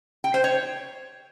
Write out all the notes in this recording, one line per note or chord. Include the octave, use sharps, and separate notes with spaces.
G5
C5
C#5